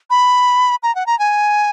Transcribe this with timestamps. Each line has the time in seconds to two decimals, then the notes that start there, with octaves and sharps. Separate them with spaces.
0.10 B5
0.83 A#5
0.95 F#5
1.07 A#5
1.19 G#5